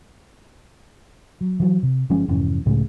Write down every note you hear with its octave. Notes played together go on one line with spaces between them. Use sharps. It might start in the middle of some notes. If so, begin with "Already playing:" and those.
F#3
E3 F#3
C3
G1 F3 G#3 C#4
F1 G#2 E3 C#4
C#2 A2 C#3 G#3